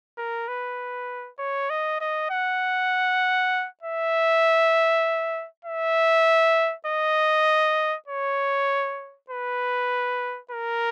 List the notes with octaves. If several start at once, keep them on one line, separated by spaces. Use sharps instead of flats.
A#4
B4
C#5
D#5
D#5
F#5
E5
E5
D#5
C#5
B4
A#4